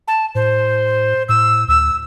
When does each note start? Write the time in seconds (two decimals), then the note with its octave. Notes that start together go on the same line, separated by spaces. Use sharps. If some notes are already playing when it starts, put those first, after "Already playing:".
0.08 A5
0.35 A2 C5
1.29 A2 E6
1.68 D2 E6